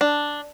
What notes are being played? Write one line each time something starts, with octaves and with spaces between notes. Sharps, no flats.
D4